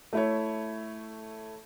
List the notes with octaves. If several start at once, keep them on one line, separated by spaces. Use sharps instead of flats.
A3 E4 C#5